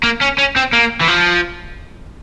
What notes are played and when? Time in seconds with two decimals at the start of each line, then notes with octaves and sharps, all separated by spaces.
0.03 A#3
0.21 C#4
0.38 C#4
0.56 C4
0.73 A#3
1.01 E3
1.08 F3